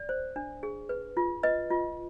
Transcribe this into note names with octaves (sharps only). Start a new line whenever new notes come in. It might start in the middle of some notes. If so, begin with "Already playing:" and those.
Already playing: D5
C5
D4
G#4
B4
F4
B4 D#5
F4